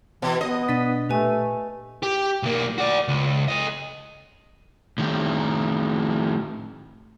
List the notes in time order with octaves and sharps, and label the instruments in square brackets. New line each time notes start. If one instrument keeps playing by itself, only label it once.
[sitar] B2 [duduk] E3
[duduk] B3 [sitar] D#5
[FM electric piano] B2 D4 B6 [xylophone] A6 D#7
[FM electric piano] A#2 [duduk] A3 [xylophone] G4 B4 G#5
[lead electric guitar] G4
B1 A#3
F#4 D5
C#2
A4 D#5
A2 D#3